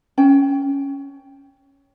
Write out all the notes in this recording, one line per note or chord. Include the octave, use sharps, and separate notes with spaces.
C#4 G5